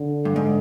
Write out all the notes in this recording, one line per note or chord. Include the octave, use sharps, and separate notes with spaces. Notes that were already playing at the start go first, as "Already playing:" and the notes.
Already playing: D3
G2
G#2